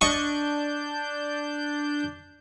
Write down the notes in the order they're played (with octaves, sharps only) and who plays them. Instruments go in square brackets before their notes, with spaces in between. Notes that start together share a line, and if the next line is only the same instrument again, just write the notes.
[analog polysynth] D4 G6 [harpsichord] D#5 C#6